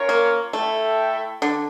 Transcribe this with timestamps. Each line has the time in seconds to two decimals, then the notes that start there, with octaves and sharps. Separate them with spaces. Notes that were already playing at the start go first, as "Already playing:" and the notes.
Already playing: C#4 F4 A#4 C#5
0.09 A#3
0.53 A3 E4 A4 E5 G5
1.42 D3